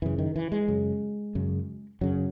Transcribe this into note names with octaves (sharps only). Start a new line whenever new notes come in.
F#2 C#3 E3
D#3
E3
G#3
F#2 C#3
F#2 C#3
F#2 C#3 F#3